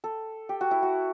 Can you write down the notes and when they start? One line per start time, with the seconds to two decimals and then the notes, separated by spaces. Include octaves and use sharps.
0.04 A4
0.49 G4
0.61 F#4
0.71 E4
0.82 F#4